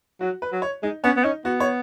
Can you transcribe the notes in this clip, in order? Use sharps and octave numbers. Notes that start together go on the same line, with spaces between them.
F#3 F#4
B4
F#3
C#5
G#3 D#4
B3 C#4
B3
C#4 D#4
B3 F#4
C#5